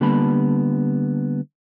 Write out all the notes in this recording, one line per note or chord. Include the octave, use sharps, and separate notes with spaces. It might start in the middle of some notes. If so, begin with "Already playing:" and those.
D3 G3 A#3 B3 A5 B5